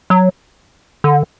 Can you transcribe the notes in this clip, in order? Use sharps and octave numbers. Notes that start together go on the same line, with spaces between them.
F#3
D3